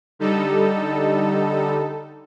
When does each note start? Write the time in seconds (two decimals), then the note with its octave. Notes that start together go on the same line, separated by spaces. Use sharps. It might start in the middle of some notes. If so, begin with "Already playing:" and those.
0.19 D3 G3 D#4 A4